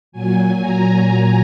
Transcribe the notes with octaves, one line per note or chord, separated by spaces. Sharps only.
A#2 F#3 G#5
A#5
G#5